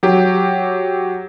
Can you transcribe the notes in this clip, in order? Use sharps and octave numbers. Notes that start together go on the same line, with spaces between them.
F#3 G4